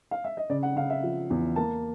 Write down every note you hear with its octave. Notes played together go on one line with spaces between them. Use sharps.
F5
E5
D#5
C#3 D5
F#5
C#3 F5
E5
F3
E2
A#3 A5